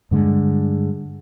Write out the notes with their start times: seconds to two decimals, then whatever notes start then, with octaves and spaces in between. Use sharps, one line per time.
0.11 G2 D3 G#3